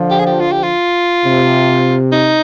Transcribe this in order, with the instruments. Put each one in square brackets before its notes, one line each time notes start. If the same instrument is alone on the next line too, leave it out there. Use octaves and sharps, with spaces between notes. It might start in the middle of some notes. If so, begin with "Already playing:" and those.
Already playing: [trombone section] D3 F3
[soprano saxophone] G4
G#4
G4
F4
G4
F4
[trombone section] C3
[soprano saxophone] D#4